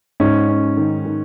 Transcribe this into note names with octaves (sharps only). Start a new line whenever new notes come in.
G#2 C#4
C#4
D#3
D#3